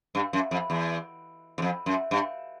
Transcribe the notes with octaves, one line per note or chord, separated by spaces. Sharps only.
G2
F#2
F2
E2
E2
F2
F#2
G2